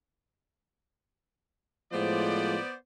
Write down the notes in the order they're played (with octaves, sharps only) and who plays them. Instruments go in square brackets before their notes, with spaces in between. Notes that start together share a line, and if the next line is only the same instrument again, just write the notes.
[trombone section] A2 F3 G#3 [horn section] B3 C5 D5